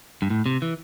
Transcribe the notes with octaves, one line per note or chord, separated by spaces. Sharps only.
G2
A2
C3
E3